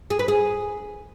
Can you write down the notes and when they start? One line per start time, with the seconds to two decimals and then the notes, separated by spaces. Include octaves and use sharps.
0.10 G#4
0.19 B4
0.28 G#4